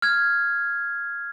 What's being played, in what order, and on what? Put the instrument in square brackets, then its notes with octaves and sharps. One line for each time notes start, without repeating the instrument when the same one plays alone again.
[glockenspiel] F6 G#6